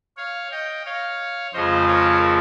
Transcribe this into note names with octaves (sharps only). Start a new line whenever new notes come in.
C#5 F5
D#5 G5
C#5 F5
F2 C#3 F3 G#3 C5 D#5
A#4 C#5